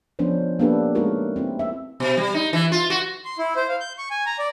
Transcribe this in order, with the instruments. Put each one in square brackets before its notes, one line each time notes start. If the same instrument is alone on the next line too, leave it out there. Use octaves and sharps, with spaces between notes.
[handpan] F3 B3 C#4 D4 C5
A#3 B3 D4 G4 A4 B4
G#3 A3 C#4 D#4 F#4 A#4
C4 E4
E5
[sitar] B2
G3
D#4
E3
F4
F#4
[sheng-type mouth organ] C6
E4
C5
F5
G6
C#6
G#5
A#5
D5